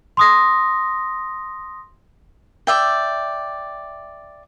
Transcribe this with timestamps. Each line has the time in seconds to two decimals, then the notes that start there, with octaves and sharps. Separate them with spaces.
0.17 C6 D#6 A#6
2.67 D5 E5 G5